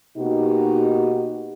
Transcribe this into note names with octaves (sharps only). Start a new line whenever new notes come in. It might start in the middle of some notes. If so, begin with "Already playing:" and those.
B2 A#3 D#4 F#4 G4